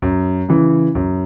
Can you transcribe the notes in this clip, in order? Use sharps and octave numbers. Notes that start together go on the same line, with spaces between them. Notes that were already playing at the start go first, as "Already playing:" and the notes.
F#2
C#3 E3
F#2